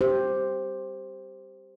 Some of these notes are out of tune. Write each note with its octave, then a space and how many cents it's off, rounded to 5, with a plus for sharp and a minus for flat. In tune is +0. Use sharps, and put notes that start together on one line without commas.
G4 +0 C5 +0